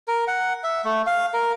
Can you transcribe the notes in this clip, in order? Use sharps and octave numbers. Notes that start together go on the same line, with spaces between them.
A#4
F#5
E5
A3
F5
A#4